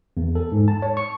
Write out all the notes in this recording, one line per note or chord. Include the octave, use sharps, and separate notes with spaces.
E2
A4
G#2
A5
C#5
C#6